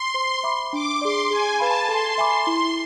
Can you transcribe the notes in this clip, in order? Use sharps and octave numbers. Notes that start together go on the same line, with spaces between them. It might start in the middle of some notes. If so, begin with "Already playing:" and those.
Already playing: C6
C5
E5 B5 D6
D4 D6
G#4 D5 C6
G#4 G#5
B4 F5 A5 B5
A4 C6
E5 G#5 B5 D6
E4